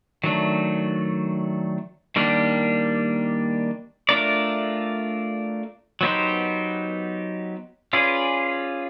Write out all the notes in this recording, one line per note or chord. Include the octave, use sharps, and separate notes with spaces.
D#3 F#3 A3 D4
D#3 G3 A#3 D4 G4
A3 D4 F4 A#4 D5
F#3 B3 D#4 G4 C5
C#4 F4 G#4 B4 D5